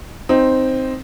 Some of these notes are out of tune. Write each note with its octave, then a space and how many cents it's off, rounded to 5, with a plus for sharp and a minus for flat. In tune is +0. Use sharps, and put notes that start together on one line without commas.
C4 +0 D#4 +0